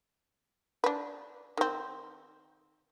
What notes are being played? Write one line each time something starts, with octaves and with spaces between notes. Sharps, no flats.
D4 B4
D#3 C4